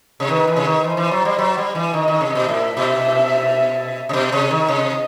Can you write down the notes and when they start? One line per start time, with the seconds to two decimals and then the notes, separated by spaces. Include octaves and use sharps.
0.20 C3
0.29 D#3 B4
0.48 E3
0.56 C3
0.65 D#3
0.84 E3 C5
0.97 E3
1.11 F#3
1.25 G3
1.38 F#3
1.57 G3
1.75 E3
1.94 D#3 D#5
2.08 D#3
2.21 C3
2.35 B2
2.49 A2 E5
2.77 B2
4.09 C3
4.13 B2
4.32 C3
4.51 D#3
4.68 C3 D#5